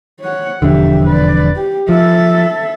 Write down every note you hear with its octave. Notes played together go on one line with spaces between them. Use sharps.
C#5 F#5
E1 F2 D3 G4 E5
B4 D5
G4
F3 A4 E5